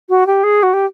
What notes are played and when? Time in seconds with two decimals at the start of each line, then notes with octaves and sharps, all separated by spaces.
0.09 F#4
0.27 G4
0.44 G#4
0.63 F#4
0.73 G4